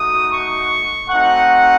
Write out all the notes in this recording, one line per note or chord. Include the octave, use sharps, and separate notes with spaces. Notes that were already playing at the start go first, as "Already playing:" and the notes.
Already playing: A3 D#4 F#4 D#6
C#6
A3 C4 D#4 F#4 F#5